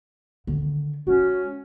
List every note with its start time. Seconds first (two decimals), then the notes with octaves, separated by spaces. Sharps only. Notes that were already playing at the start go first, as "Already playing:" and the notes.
0.47 D3 D#3
1.07 G#3 C#4 F#4